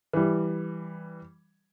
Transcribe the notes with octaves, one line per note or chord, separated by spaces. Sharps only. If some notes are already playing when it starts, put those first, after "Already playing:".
E3 G3